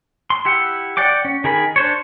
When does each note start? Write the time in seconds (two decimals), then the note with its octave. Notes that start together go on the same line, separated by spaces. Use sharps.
0.30 C6
0.45 E4 G4 F#5
0.97 D5 F#5 G5 D6
1.25 C#4
1.44 D#3 G#4 A#4 B5
1.76 D4 C5 C#5